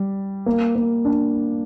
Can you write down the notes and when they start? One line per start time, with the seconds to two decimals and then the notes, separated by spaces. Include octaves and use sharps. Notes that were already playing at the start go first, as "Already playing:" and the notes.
Already playing: G3
0.46 A#3
0.76 A#3
1.05 D4